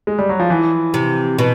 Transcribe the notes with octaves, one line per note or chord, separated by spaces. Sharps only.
G#3
G3
F#3
F3
E3
C3
B2